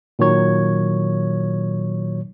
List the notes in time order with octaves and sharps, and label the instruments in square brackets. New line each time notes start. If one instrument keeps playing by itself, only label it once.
[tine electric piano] A#2 D#3 F#3 C#5 G#6